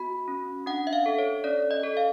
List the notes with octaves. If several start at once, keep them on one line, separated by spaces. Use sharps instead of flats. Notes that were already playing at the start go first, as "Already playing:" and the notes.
Already playing: B3 F#4 B5
C#4
D4 F#5
E5
F5
A4
C#5
C#4 D5
D#5
A4
F5